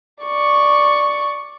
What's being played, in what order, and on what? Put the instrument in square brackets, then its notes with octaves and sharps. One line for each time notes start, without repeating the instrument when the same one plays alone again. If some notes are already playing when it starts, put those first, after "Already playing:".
[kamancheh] D5 C#6